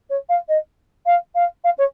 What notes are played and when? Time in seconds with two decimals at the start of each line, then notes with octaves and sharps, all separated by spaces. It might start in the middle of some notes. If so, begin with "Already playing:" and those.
0.09 C#5
0.29 F5
0.48 D#5
1.06 F5
1.35 F5
1.64 F5
1.78 C#5